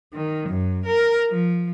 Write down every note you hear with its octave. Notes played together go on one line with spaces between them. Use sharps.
D#3
F#2
A#4
F3